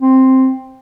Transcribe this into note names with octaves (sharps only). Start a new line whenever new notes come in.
C4